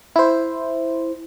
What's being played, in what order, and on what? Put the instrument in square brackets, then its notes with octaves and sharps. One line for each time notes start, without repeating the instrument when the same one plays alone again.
[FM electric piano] E4 C5